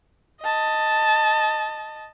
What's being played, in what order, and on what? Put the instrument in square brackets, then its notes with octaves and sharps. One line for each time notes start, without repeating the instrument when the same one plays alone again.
[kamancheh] D#5 A5